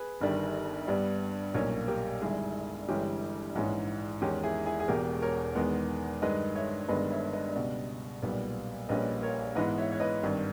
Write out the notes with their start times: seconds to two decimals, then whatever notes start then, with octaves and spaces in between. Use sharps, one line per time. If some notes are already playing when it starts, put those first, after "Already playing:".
Already playing: G#4 B4
0.21 G1 G2 D#3 G3
0.88 G2 G3 B3
1.54 B1 A#2 G3 A#3 C#4 A#4 C#5
1.88 G4 A#4
2.21 G1 G2 D#3 G#3 E4 G#4
2.89 G1 G2 E3 G#3 C#4 G4
3.55 A#1 G#2 E3 G#3 C#4
4.22 E2 D#3 G#3 C#4 G4
4.43 E4 G#4
4.66 E4 G#4
4.80 G#4
4.88 E1 E2 B2 G4 A#4
5.22 A#4 C#5
5.55 E2 D#3 G#3 B3
6.22 G2 D#3 G#3 B4 D#5
6.55 C#5 E5
6.88 G1 G2 D#3 G#3 B3 B4 D#5
7.11 C#5 E5
7.33 B4 D#5
7.56 C#2 B2 G3
8.22 B1 A#2 G3 B3
8.89 A#1 A#2 G3 C#4 B4 D#5
9.22 A#4 C#5
9.56 G#2 E3 G#3 B3 B4 D#5
9.78 C#5 E5
9.91 C#5
10.00 B4 D#5
10.23 G#1 G2 D#3